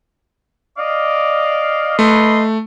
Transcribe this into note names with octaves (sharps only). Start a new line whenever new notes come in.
D5 D#5 F5
A3 B4 D#5 C6